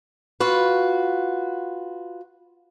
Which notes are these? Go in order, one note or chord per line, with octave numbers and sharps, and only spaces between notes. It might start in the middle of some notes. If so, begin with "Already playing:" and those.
F4 F#4 B4